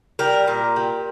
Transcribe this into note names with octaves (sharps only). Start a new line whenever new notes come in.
G3 A#4
A#2
G3